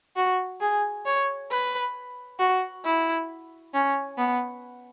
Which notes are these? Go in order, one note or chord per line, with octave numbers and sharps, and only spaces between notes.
F#4
G#4
C#5
B4
F#4
E4
C#4
B3